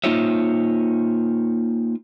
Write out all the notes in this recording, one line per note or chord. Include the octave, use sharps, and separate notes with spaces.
A#3 D#4 F4 C5 C#5 E5